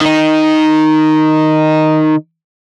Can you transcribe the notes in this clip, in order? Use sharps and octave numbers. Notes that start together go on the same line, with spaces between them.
D#3 D#4